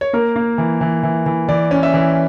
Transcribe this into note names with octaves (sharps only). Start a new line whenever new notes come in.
C#5
A#3 A#4
A#3
E3
E3
E3
E3
E3 D5
C#4
E5
E3